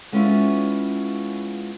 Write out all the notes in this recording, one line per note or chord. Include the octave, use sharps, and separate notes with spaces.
G#3 B3 C#4 E4 F4